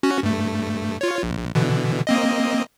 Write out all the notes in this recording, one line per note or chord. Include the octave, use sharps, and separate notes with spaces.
C#4 F#4
G2 A3
F4 C#5
A#1
B2 D3 E3
A#3 C4 D#5